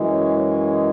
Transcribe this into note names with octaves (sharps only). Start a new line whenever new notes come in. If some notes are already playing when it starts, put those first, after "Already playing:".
Already playing: F#2 E3 G#3
C#5
C#5